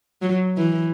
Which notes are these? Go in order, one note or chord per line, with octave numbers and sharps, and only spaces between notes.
F#3
E3